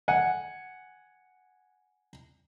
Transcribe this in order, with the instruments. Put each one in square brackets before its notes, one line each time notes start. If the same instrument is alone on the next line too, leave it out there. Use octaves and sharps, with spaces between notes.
[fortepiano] F#5 G#5